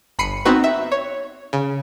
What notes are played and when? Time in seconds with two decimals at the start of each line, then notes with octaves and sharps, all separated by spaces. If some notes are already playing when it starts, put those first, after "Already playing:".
0.19 G1 B5 C7 C#7 D#7
0.45 B3 C4 D#4 F#4 B4
0.64 E5
0.92 C#5
1.53 C#3